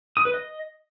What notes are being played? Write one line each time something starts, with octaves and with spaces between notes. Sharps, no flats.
D#6
B4
D#5